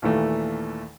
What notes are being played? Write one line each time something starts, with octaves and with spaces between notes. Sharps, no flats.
D#2 A#2 E3 A3